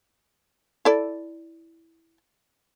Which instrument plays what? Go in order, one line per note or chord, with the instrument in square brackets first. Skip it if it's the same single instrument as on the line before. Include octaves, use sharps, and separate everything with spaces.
[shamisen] E4 A4 D5